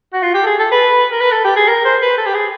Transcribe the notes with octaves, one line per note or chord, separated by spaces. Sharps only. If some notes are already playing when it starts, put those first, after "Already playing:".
F#4
F4
G4
A4
G#4
A4
B4
A#4
B4
A4
G4
G#4
A#4
C5
B4
A4
G4
G#4